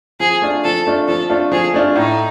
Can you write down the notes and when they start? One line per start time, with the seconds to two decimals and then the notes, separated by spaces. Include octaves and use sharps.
0.20 F3 G#4
0.42 A3 D4 F4
0.64 F3 A4
0.87 A3 D4 F4
1.08 F3 A4
1.29 A3 D4 F4
1.52 F3 G#4
1.74 A3 D4 F4
1.96 A2 D#4